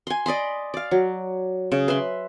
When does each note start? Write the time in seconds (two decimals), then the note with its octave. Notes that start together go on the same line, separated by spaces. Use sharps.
0.07 G#5 C6
0.26 D5 D#5 B5 C6
0.74 D5 F5
0.91 F#3
1.72 C#3
1.88 B4 E5 B5 C6